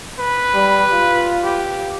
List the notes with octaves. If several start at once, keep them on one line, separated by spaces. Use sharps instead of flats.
B4
G3
F4
G4